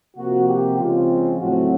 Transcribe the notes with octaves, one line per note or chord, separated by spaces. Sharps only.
C3 F3 A#3 F#4
G4
C#3 F3 G#3 C4 F4
A2 F#3 A3 C4 F#4